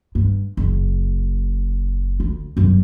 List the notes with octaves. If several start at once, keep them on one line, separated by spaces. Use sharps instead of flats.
G2
F#1
D2
G1 F#2